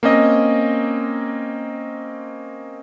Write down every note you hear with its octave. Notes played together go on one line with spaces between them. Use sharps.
A#3 C4 C#4 D#5